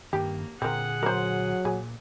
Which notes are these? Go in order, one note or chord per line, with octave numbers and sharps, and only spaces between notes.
G2 D#3 A#3 G4
A#2 D3 C4 G#4 A#4 F#5
F#3 A#4 C5
A#2 G#4